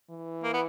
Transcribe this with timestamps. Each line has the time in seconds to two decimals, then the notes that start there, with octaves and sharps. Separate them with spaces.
0.10 E3
0.44 A#3
0.53 B3